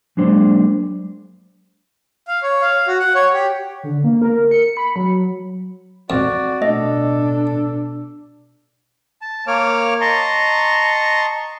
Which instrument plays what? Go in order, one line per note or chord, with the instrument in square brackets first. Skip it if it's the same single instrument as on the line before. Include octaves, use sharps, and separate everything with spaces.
[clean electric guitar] F#3 G#3 A#3 D4 C5
[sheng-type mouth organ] F5
C#5
F5
F#4
F#5
C#5
G4
[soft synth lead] D3
A#3
A#4
C#7
B5
F#3
[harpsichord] F2 [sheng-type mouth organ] F#4 D5
[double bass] B2 D4 [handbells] A3 D#5 [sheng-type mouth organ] A4
[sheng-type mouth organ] A5
A#3 C#5 D6 F6
D#5 A5 A#5 C6 C#6